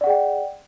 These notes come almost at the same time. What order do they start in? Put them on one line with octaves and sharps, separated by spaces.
D5 F#5 G#4 G5